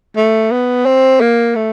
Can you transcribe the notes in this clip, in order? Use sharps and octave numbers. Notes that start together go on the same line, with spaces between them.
A3
B3
C4
A#3
A3